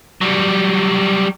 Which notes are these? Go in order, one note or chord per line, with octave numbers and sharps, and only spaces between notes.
F#3 G3